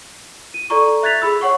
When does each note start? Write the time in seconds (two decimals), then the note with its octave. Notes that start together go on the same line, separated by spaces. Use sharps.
0.54 D#7
0.70 A4 D5 A#5 C#6
1.03 E5 F#6 G#6 A6 B6 F7
1.22 G#4 B5 E6
1.41 C#5 F#5 C#6